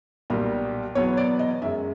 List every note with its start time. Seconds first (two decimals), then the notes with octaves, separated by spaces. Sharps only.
0.30 B1 A#2 G3 A#3
0.95 E2 B2 F#3 B3 C#5
1.17 D5
1.39 D#5
1.62 F#2 D#3 G#3 E5